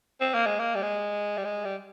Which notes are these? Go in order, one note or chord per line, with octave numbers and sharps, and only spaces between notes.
C4
A#3
G#3
A#3
G3
G#3
G3
G#3
G3